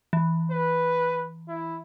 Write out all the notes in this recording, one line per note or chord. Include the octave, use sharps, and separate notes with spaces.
E3
B4
E4